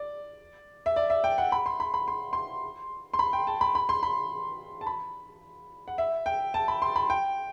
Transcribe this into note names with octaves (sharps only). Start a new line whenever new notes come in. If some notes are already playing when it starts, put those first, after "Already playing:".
Already playing: D5
E5
D5
E5
G5
F#5
B5
C6
B5
B5
C6
C6
C6
B5
G5
A5
B5
B5
C6
B5
A5
B5
F#5
E5
G5
A5
B5
C6
B5
G5